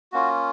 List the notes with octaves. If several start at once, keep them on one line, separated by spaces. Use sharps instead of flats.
A#3 C#4 F4 F#4